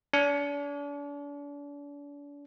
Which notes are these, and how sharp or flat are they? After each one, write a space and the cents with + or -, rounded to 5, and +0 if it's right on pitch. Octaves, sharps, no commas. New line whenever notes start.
D4 -40